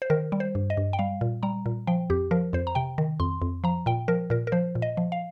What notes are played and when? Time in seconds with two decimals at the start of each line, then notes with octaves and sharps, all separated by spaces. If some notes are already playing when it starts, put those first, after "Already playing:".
0.02 C5
0.10 D#3 A#4
0.32 G3
0.40 C5
0.55 G2
0.70 D#5
0.77 G2
0.93 G5
0.99 G3 F5
1.21 A#2
1.43 G3 A#5
1.66 A#2
1.87 F3 G5
2.10 F2 G4
2.31 F3 A#4
2.53 F2 C5
2.67 A#5
2.75 C3 G5
2.98 D#3
3.20 F2 C6
3.42 F2
3.64 F3 A#5
3.86 A#2 G5
4.08 F3 A#4
4.30 A#2 A#4
4.47 A#4
4.52 F3 C5
4.75 A#2
4.82 D#5
4.97 F3
5.12 F5